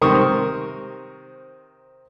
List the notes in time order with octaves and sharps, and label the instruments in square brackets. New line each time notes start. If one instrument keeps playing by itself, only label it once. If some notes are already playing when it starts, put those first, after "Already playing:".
[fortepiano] C3 D#3 A#4 C5 C#6 D#6